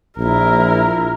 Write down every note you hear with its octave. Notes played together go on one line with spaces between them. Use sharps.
A#1 E4 A#4